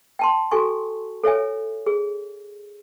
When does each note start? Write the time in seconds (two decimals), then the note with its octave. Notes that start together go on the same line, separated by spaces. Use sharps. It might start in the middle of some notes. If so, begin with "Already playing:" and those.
0.19 G5 A5 C6
0.51 F#4 A4 G#5 C#6
1.23 A4 C#5 E5 G#5
1.86 G#4